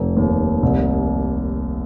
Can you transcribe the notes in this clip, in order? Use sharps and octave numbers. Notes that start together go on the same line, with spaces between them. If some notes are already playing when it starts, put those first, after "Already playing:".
Already playing: F1
D#2
C2